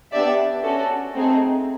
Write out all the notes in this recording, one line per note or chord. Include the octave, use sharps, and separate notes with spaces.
B3 D4 G4 D5 E5
C#4 F#4 A4
A3 C4 D#4 G#4